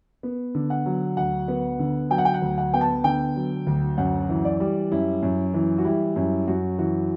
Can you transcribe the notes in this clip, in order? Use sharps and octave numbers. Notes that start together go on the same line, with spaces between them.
B3
D3
F#5
F#3
D2 F#5
B3
D3
F#3 G5
F#5
G5
F#5
D2
F#5
B3 G5
A5
D3 G5
F#3
D2
F#2 F#5
E3
D5
G3
F#2 E4
F#2
E3
F#4
G3 E4
F#2 E4
F#2 F#4
E3 F#4